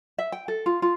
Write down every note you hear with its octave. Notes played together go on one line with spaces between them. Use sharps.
E5
G5
A4
F4
F4